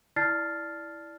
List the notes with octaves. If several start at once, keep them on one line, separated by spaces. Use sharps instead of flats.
E4 D5 A5 F6 A6 C7